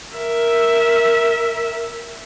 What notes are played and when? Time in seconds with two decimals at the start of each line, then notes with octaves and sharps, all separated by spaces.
0.15 A#4 E5